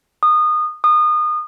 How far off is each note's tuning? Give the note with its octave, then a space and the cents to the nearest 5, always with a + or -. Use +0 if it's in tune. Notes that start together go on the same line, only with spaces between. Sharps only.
D#6 -25
D#6 -30